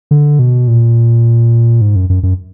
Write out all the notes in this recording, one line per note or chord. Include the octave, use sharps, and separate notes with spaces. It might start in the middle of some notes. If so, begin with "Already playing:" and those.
D3
B2
A#2
G#2
F#2
F#2
F#2